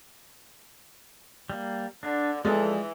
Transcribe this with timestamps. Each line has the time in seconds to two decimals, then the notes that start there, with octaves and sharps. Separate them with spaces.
1.50 G3 A#3
2.03 D3 D4
2.45 E3 F3 G#3 A4 D5 D#6